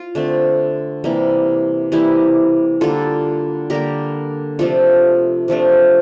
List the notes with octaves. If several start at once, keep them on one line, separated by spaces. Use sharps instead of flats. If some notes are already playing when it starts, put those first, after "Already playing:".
Already playing: F4
D3 A3 C4
C3 E3 G3 A#3
C3 E3 G3 A#3 E4 G4
D3 G3 A#3 F4 A4
D3 G3 A#3 G4 A#4
C3 F3 A3 D4 F4 A4
C3 F3 A3 D4